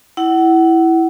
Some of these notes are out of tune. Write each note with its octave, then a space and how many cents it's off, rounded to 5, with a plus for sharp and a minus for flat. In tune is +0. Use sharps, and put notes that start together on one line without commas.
E4 +0 F#5 +25